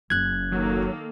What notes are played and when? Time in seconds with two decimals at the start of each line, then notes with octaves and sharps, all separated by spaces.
0.10 F#1 C#4 F#6 G#6
0.52 D#3 F#3 A#3 A4